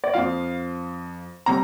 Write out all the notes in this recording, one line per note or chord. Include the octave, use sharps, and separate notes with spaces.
D5
F2 F3 F5
C3 G3 A#5